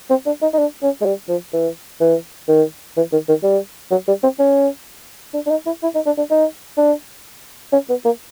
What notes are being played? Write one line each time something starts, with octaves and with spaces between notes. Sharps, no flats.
C4
D4
D#4
D#4
D4
C#4
G#3
G3
F3
E3
E3
D#3
E3
D#3
D#3
G3
F#3
G3
C4
C#4
D4
D4
D#4
E4
E4
D#4
D4
D4
D#4
D4
C#4
B3
A#3